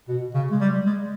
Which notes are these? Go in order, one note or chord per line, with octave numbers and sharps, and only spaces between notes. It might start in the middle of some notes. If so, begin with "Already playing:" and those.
B2
C#3
G#3
G3
G#3